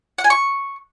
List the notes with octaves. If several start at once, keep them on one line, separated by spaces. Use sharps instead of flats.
F#5
G#5
C#6